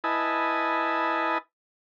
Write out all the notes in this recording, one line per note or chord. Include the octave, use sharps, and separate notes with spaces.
E4 B4 D#5 G#5 A5